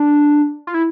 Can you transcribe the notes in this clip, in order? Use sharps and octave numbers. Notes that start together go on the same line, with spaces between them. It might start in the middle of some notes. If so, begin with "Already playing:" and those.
Already playing: D4
F4
E4